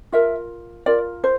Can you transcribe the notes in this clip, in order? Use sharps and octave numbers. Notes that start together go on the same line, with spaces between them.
F4 A#4 E5
F4 A#4 D5
C5